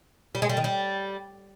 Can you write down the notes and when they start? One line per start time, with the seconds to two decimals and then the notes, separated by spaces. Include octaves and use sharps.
0.35 G3
0.42 G#3
0.49 G3
0.57 D#3
0.64 G3